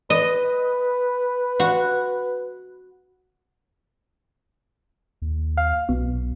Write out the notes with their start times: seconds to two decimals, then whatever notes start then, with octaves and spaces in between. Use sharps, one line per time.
0.10 B4 D#5
1.60 F#4
5.22 D#2
5.57 F5
5.89 B1 B2